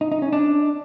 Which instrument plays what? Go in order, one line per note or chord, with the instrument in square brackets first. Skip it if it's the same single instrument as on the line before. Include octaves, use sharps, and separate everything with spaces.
[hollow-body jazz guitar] D#4
D#4
C#4
D4